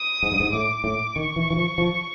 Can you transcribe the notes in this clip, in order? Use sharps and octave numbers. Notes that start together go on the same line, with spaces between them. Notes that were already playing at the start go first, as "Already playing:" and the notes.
Already playing: D#6
G#2
G2
G#2
A2 D6
A2
D#3 C#6
E3
E3
F3
F3